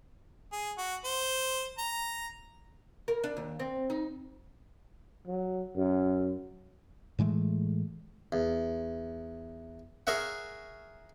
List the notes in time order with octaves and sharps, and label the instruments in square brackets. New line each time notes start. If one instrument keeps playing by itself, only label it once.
[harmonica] G#4
F#4
C5
A#5
[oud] A#4
D4
D#2
C4
D#4
[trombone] F#3
F#2
[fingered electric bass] A2 E3 G#3 A3
[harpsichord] E2
G#4 A#4 C#5 E5 F#5